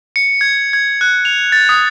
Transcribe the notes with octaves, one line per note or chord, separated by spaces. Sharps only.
C#7
G#6
G#6
F#6
F7
A6
D#6